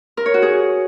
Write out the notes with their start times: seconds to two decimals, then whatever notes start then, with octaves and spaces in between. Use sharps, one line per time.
0.17 A#4
0.26 C#5
0.34 F#4
0.42 G#4